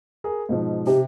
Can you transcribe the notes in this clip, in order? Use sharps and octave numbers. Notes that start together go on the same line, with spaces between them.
G#4 A#4
G#2 B2 F3
C3 G4